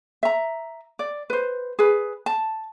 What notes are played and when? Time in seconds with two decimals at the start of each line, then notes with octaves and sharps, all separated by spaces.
0.23 E5 A#5
0.99 D5
1.30 B4 C5
1.79 G#4 B4
2.26 A5